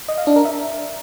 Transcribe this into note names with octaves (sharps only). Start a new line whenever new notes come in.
D#5
F5
D4
A#4
E5